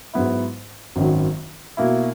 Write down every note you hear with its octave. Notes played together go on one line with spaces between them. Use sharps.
G#2 F#3 B3 E4
G#1 F#2 D#3 F#3
B2 A#3 E4